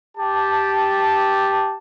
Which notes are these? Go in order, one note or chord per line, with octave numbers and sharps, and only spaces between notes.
G4 A5